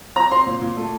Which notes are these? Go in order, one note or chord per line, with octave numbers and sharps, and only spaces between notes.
C4 A#5
C4 C6
A#2
A#2
A3